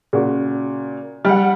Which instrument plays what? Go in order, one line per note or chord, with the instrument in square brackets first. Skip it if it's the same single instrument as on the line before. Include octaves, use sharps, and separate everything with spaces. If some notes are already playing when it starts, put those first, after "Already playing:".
[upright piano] A#2 C#3 F#4
[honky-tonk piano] G3 F#5 [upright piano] F6